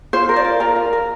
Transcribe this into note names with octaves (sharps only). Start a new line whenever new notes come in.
F4 C5
A#4
D5
F4
A#4 A#5
F4
A#4